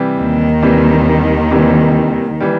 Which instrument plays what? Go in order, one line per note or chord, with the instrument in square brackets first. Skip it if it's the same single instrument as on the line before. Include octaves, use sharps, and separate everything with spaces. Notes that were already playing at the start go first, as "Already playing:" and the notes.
Already playing: [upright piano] C3 E3 G3
[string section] D#2 D#3
[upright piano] C3 E3 G3
C3 E3 G3
E3 G3